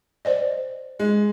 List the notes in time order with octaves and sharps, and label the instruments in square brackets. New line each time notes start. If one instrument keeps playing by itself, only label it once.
[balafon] C5 D5 D#5
[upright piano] G#3